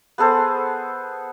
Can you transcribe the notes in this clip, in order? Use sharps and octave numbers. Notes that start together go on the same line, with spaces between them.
B3 G#4 A4 C5